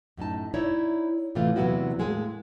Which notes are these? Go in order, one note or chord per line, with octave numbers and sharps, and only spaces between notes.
F#2 A2 D#4 A5
D#4 E4 C#5 D5 E5
A2 C3 E3 A3 F4
E2 C3 F#3 B3 E4 F#4
A2 G#3 A#3 G#4